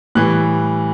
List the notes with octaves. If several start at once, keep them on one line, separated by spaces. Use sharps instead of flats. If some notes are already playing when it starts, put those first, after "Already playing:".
A2 E3 G3 F#6